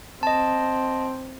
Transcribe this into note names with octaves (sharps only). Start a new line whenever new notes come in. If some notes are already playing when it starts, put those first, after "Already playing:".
C4 D#5 A5